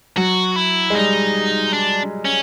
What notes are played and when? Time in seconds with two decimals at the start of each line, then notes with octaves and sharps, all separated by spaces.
0.17 F#3 F#4
0.56 E4
0.90 G#3
0.95 G3 D#4
1.73 D4
2.25 C#4